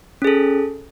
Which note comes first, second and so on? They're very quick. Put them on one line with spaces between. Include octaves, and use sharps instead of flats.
C#4 G#4 A4